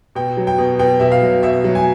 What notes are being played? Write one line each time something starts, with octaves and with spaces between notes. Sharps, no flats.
B2 G5
F#3
G5
B2
B2 G5
B2 E5
F5
F#3
B2 E5
F#3
G#5